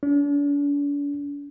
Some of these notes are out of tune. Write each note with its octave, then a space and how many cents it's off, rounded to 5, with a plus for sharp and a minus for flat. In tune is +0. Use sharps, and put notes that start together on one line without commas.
D4 -45